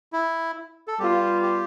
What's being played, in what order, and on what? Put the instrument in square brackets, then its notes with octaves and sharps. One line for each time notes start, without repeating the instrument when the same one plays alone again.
[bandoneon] E4
A4
[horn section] G3 B3 F4 [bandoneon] G4
[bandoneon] G4